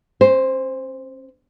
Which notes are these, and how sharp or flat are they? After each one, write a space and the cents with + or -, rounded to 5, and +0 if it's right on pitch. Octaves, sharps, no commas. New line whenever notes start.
C#4 -45 C5 +0